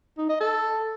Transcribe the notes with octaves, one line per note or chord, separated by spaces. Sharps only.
D#4
D#5
A4